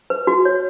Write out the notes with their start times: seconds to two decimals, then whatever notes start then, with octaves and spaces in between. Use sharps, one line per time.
0.10 B4
0.27 F#4
0.45 C#5